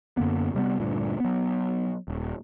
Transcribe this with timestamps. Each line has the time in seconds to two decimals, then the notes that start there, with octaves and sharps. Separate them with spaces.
0.17 F#2 D3 A#3 B3
0.55 C3 G3 A#3 B3
0.80 D2 G2 A#2
1.20 F#3 B3
2.08 D#1